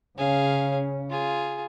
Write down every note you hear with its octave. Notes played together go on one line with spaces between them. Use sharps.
C#3 C#4 G#4 F5
F4 G#4